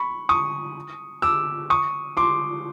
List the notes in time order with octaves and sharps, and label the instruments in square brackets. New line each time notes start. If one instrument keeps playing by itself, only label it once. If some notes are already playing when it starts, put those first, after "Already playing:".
Already playing: [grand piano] B5 C#6
C#6 D#6
D6 E6
C#6 D#6
C6 D6